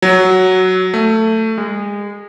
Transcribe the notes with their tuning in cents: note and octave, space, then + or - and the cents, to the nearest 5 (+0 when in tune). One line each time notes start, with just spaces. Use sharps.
F#3 +5
A3 +15
G#3 -30